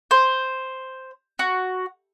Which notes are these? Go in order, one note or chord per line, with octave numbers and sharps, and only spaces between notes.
C5
F#4